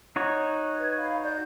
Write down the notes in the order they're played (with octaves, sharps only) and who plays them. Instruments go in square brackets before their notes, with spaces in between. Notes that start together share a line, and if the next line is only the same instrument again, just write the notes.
[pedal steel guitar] D#4 F#4 C#5
[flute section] B4 G#6
F5 B5
D5 G6